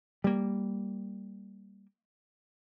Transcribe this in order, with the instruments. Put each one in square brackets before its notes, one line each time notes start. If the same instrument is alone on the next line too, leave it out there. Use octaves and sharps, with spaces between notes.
[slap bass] G3 A#3